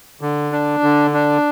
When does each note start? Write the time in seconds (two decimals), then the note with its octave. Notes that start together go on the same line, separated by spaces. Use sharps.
0.21 D3
0.52 D4
0.83 D3
1.14 D4